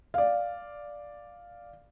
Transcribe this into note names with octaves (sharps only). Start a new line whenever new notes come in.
D5 F5